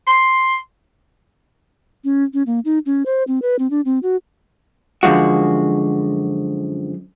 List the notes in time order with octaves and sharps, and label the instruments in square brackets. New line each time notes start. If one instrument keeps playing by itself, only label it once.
[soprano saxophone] C6
[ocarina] C#4
C#4
A#3
D#4
C#4
C5
C4
B4
C4
D4
C4
F#4
[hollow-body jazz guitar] F#2 D3 F3 G#3 F#4